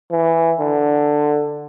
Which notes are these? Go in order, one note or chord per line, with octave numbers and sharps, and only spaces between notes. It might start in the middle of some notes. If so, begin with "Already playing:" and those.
E3
D3